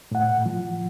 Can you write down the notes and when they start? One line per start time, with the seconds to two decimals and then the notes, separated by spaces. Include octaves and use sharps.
0.11 A2 F#5
0.46 F3